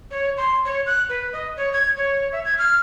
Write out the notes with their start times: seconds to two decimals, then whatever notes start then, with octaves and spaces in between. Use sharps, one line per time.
0.11 C#5
0.37 C6
0.65 C#5
0.86 F#6
1.09 B4
1.33 D#5
1.57 C#5
1.73 G#6
1.97 C#5
2.32 E5
2.45 G#6
2.58 F6